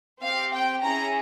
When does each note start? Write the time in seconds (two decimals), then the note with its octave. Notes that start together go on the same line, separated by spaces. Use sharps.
0.22 C4 G4 F5
0.53 G5
0.83 C#4 E4 G#4 A#5